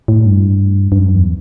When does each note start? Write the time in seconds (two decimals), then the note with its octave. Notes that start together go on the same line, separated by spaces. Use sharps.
0.08 A2
0.26 G2
0.92 G2
0.98 F#2
1.15 E2